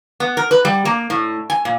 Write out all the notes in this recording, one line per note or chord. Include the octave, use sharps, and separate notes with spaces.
B3
A#4
B4
G3
A#3
A2
G#5
A#2